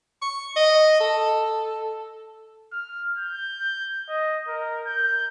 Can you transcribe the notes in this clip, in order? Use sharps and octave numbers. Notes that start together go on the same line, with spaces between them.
C#6
D#5
A4
F6
G6
D#5
A#4
G6